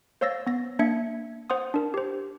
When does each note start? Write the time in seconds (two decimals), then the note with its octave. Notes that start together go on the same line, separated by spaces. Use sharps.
0.21 C5 C#5 F5 E6 A6 A#6
0.47 B3 A#6
0.79 A#3 D4 E5 G#6 C#7
1.50 C5 F#5 C6 D#6
1.74 D4 A#4
1.94 G4 C5